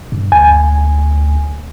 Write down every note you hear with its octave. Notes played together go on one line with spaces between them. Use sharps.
G2
D2 G#5